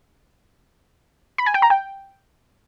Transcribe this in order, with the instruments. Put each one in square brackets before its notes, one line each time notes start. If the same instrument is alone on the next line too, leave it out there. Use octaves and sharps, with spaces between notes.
[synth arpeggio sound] B5
G#5
G5
A#5
G5